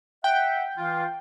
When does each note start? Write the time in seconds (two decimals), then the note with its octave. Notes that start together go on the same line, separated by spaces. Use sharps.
0.24 E5 F#5 G5
0.77 E3 F4